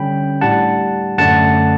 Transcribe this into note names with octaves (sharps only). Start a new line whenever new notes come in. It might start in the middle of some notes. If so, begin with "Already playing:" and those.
Already playing: D3 G3 C#4 G5 B5
A2 G3 D4 F#5 A5
F#2 D3 A3 D4 F#5 A5